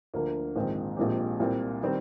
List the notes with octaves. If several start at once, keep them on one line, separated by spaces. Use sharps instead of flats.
D2 D3 F3 A#3
A#1 G#2 D#3 G#3 C4
A#1 A#2 G#3 C4 G4
C2 A#2 G3 C4
D#3 G3 C4